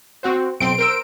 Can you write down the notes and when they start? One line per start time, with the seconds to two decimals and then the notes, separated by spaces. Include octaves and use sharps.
0.23 C4 F#4 C5
0.60 B1 C4 C6 D7
0.78 A#4 C5 E6